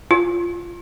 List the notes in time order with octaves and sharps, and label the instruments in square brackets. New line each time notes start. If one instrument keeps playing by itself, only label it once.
[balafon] F4